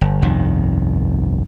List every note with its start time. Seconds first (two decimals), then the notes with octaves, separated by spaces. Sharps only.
0.01 G1
0.22 G1 C2 F2 D#3